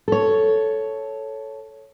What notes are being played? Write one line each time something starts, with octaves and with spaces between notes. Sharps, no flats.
A4 C#5